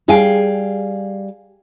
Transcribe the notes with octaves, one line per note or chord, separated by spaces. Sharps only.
G3 G#4 F5 G5 G#5